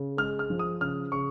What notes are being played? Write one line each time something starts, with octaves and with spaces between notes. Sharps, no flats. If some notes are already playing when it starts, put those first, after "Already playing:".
Already playing: C#3
G#3 F6
F6
F3
D#6
C#3 F6
C#3 C#6